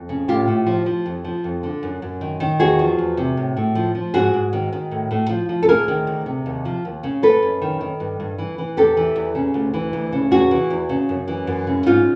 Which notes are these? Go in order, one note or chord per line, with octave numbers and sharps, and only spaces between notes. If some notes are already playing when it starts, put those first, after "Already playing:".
Already playing: F2
C#3
A2 F4 G4
A2
F3
F3
F2
F3
F2
D3
F#2
F#2
D#3
D#3
E2 F#4 G#4
F3
E2
C3
A2
A2
F3
F3
G#2 F#4 G#4
G#2
D#3
D#3
A2
A2
F3
F3
A4
D2 G#4 A#4
D#3
D2
C3
D#2
F3
D#2
C#3
F#2 A4 B4
F#2
D#3
D#3
G2
G2
E3
E3
E2 G4 A4
E3
E2
C#3
D2
E3
D2
C#3
E2 F#4 G#4
E3
E2
C#3
F#2
E3
F#2
C#3
G#2 D#4 F4